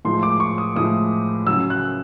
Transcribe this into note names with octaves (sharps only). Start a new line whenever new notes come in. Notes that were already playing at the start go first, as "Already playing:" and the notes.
A2 F3 G#3 C6
D6
C#6
D#6
A2 F3 G#3 D#6
C#3 F#3 E6
F#6